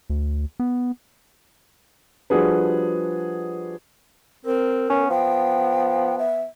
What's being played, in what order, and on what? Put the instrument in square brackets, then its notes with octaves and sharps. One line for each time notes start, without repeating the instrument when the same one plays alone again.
[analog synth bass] D2
B3
[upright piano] F3 G3 D4 F#4 G#4 B4
[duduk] C4 [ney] A#4
[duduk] B3 [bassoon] C#4
[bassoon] F3 [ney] G5
[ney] E5